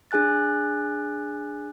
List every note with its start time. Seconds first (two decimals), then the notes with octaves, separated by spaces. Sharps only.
0.11 D4 G#4 G#5 F#6 A6